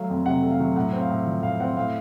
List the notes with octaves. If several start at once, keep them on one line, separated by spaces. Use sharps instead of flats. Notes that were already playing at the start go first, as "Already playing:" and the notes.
Already playing: F#3 A3 F5
F2
C3 F#5
A3
F5
F#3
A2 F#5
C4
F5
A2
F3
A2 F5
C4 F#5
A2 F5